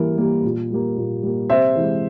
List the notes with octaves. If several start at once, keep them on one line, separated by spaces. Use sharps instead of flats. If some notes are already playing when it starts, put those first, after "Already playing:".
Already playing: E3 G3 A#3 A#4
G3 A#3
A#2
G3 A#3
A#2
G3 A#3
C3 C5 E5
E3 G#3